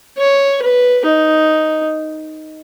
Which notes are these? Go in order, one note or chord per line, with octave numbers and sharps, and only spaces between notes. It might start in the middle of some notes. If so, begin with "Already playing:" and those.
C#5
B4
D#4